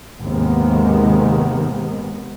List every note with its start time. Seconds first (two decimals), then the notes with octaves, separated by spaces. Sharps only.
0.22 D#2 G#2 C3 D#3 G#3 B3